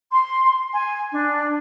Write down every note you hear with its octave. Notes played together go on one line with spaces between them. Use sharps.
C6
G#5
D4